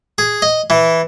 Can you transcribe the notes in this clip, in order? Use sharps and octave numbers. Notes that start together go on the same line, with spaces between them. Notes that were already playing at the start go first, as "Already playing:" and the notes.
G#4
D#5
E3